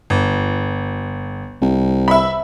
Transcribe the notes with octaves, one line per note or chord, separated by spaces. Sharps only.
G1
C2
E5 B5